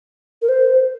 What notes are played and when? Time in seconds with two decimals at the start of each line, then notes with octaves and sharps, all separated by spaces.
0.42 A#4
0.49 C5